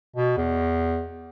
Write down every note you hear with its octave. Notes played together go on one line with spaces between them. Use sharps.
B2
E2